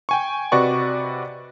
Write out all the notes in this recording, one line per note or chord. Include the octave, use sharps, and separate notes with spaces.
G5 G#5 C#6
C3 F#4 B4 D5 D#5 C#6